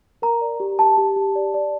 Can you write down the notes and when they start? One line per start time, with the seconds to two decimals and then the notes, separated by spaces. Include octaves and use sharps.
0.22 A#4 A#5
0.41 D5
0.60 G4
0.79 G4 A5
0.97 G4
1.16 G4
1.35 D5
1.54 D5